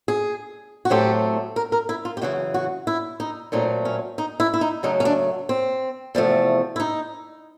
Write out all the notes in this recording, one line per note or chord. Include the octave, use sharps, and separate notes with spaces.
G#4
F#4
A2 F#3 A3 C4 G4
A#4
A#4
E4
F4
G4
F#2 C#3 E3 F#4
F#4
E4
D#4
A#2 F#3 A3 C4 D#4
C#4
D#4
E4
E4
D#4
F#2 C#3 F#3 A3 D#4
C#4
D4
C4
E2 C3 F3 A3
E4
D#4